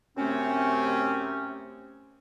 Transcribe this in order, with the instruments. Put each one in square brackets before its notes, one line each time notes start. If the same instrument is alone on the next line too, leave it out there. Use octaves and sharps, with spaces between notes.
[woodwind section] F#2 C3 A3 C4 C#4